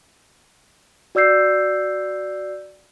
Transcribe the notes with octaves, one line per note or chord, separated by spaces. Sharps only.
F#4 D5 E6 G6 C7